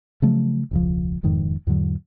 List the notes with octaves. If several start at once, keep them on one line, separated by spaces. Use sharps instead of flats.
C#3 F3 F#3 A3
E1 C#2 F3
E1 F2 G#2 D#3
E2 G#2 D3 F#3